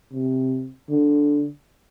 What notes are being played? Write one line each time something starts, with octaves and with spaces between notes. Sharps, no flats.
C3
D3